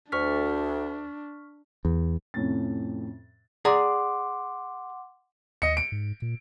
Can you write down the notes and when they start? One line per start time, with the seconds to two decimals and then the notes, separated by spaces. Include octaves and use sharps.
0.12 D2 D4 C#6 F6 B6
1.85 E2
2.34 F2 A2 C3 C#4 A6
3.65 G#4 D5 F#5 A#5 C6 D6
5.62 D#2 D#5 C#7
5.77 D7
5.92 G#2
6.22 A#2